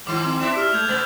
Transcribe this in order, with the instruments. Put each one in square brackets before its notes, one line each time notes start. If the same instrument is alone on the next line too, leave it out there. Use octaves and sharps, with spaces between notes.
[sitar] G#2 D#3 [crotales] D6 F#7
[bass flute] C4
[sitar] D4 E4 [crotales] E7
[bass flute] G4 [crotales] E6 F6
[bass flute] A3 [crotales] G6 G#6 F7
[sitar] C3 B3 [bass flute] C5 [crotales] A6 F#7